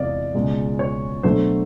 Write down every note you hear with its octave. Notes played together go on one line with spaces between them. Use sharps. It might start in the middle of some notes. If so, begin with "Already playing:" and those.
Already playing: E2 C3 E3 G#3 D5 D#5 F5
C#2 B2 G#3
C#5
B2 F#3 A3 D4 C5